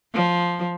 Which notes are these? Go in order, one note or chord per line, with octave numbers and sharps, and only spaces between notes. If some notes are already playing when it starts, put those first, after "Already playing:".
F3